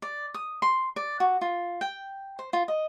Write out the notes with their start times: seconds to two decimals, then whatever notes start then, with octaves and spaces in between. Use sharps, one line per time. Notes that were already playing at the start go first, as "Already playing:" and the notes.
0.02 D5
0.34 D#6
0.62 C6
0.96 D5
1.20 F#4
1.41 F4
1.81 G5
2.39 C5
2.53 F4
2.68 D#5